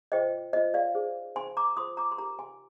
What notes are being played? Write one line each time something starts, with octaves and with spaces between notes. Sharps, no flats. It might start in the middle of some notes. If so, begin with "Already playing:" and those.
F4 C5 D#5 G5
F4 C5 D#5
D5 F5
D#4 G#4 C5
D#4 G#4 C5 G#5 C6
A#5 D6
F4 C5 C6 D#6
A#5 D6
C6
D#4 G4 A#4 A#5 D6
G#5 C6